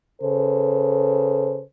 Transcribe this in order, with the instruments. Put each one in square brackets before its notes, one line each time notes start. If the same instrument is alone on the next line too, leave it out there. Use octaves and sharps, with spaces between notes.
[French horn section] C#3 A4 B4 C5